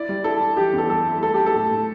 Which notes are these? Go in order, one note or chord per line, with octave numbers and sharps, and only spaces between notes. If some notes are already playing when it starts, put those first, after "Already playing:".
Already playing: E4 D5
G3
E4 A4
E4
E3 G4
E2
A4
G3 A4
E4
A3 A4
A3 G4
A4
A2
A2